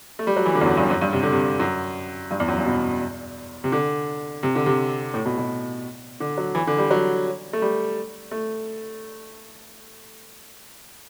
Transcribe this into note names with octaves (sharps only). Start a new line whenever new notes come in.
A3
G3
F#3
E3
D3
E2
F#2
G2
F#2
G2
C3
D3
C3
F#2
G2
E2
F#2
G2
B2
C3
D3
C3
D3
C3
A2
B2
B2
D3
F#3
E3
D3
G3
F#3
A3
G3
A3